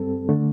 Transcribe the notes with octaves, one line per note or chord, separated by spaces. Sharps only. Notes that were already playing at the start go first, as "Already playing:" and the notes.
Already playing: G2 G3 C4 A4
D3 A3